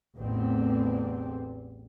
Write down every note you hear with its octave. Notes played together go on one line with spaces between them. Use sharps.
A1 E2 D3 C4